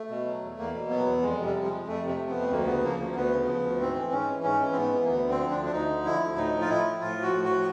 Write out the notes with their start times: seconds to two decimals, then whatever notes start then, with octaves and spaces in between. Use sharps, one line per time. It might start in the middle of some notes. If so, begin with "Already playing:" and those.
Already playing: A3
0.10 B2
0.25 F#3
0.43 E2
0.58 E2 A#3
0.74 B2
0.90 F#3 B3
1.06 E2
1.22 F2 G#3
1.39 C3
1.45 G3
1.54 F3
1.65 G#3
1.71 F2
1.87 F2 A3
2.03 C3
2.09 A3
2.19 F3
2.29 B3
2.35 F2
2.41 A3
2.51 D2 A#3
2.67 C#3 B3
2.83 F3 A#3
2.99 D2 A#3
3.16 D2 B3
3.32 C#3
3.47 F3
3.64 D2
3.80 G#2 C4
3.95 E3
4.12 G#2 C#4
4.28 E3
4.44 G#2 C#4
4.60 E3
4.72 C4
4.76 G#2 B3
4.92 E3
5.04 A#3
5.08 D2 B3
5.24 D3
5.30 C4
5.41 F3
5.51 D4
5.57 D2
5.65 D4
5.72 D2 D#4
5.89 D3
6.05 F3 E4
6.21 D2
6.36 A2 D#4
6.53 F3
6.61 F4
6.69 A2 E4
6.85 F3
7.01 A2 F4
7.17 F3
7.23 F#4
7.34 A2
7.45 F#4
7.50 F3